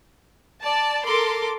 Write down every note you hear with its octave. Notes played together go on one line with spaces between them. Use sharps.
D5 A5
A4 A#4 C6 D6